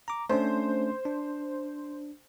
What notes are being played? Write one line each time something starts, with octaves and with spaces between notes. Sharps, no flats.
A#5 D6
A3 C#4 D4 C5
D4